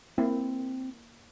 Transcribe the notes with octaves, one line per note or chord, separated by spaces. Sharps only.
A#3 C4 E4